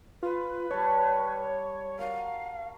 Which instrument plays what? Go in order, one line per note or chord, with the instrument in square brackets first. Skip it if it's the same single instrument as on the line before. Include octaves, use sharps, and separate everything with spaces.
[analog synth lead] F4 [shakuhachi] B4
[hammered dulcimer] G3 A5 [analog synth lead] C#5
[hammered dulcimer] F#4 A#4 [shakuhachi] F5